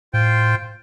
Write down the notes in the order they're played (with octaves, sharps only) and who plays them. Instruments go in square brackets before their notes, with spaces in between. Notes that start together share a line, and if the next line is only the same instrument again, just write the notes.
[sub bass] A2 [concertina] F4 C5 G5